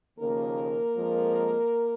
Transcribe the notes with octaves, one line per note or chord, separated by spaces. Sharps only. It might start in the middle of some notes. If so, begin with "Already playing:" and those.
D#2 C#3 F3 A#3 A#4
F2 F3 G#3